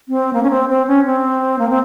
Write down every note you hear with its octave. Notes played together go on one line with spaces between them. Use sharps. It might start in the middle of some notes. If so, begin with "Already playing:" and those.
C4
A#3
C#4
C4
C4
C#4
C4
A#3
C4